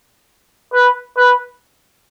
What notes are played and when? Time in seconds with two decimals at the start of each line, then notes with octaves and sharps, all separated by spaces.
0.73 B4
1.17 B4